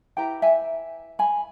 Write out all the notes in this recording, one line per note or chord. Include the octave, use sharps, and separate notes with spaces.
E4 G4 B4 G5 A#5
E5 G#5
G#5 B5